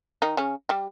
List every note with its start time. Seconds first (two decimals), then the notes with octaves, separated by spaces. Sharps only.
0.22 D#3 D#4
0.37 C#3 C#4
0.69 G3 G4